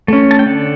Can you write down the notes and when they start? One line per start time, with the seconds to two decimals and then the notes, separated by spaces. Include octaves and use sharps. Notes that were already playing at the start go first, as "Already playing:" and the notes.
0.08 A3 C#4
0.31 A5
0.39 G5
0.46 D3 F#5